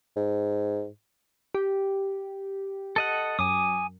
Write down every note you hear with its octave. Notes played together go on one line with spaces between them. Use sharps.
G#2
G4
A4 D#5 F#5
F#2 G#5 D6 D#6